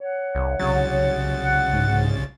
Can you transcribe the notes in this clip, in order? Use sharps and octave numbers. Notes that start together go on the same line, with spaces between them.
C#5 F#5
C2
C2 C#3 F#3 A6
F#5
G#2